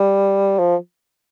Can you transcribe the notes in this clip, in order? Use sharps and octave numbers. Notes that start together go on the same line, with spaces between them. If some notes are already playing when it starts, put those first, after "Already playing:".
Already playing: G3
F3